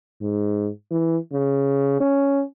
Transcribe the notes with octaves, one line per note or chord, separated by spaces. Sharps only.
G#2
E3
C#3
C#4